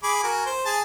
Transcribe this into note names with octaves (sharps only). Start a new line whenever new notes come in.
G#4 B5 D6
F#4 A#4 G#5
C5
G#4 A5